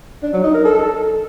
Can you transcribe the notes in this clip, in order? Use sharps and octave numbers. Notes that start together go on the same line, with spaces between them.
D4
F#3
D#4
A#4
A4